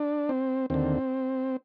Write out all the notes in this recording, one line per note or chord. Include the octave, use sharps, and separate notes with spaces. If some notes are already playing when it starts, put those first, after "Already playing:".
Already playing: D4
C4
D#2 D3 C4